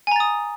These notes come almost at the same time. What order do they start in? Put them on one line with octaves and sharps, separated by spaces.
G#5 A#5 A6 D#6